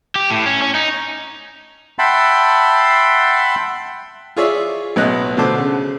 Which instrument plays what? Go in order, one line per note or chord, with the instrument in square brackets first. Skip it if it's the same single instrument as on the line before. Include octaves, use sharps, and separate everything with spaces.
[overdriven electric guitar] G4
A2
C#4
C#4
D#4
[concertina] E5 F#5 G5 A5 B5 C6
[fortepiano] F4 G#4 C#5 D5 E5
B1 A2 B3 D#5 F#6
B2 D3 A3 C5 A5 D6
C#3